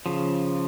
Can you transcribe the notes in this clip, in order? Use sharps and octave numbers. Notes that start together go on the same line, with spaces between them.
C#3 F3